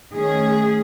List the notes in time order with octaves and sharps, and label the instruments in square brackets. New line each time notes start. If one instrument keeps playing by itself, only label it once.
[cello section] D#3 A3 C#4 G#4